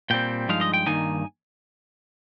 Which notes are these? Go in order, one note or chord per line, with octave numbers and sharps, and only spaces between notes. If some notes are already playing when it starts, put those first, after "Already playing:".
A#2 G3 C4 G5
G2 F3 G#3 D#4 F5
D#5
G5
G2 D#3 A#3 D#4 G#5